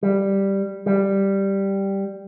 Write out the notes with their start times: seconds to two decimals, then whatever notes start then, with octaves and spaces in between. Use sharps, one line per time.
0.03 G3
0.86 G3